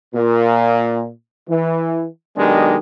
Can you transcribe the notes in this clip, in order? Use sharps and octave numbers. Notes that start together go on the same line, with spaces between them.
A#2
E3
B1 D#3 G#3 D4 G4